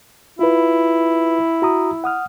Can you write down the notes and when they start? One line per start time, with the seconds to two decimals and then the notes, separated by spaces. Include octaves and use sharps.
0.39 E4 F4 B4
1.62 F#4 A#5 D#6
2.04 F#5 D#6 F6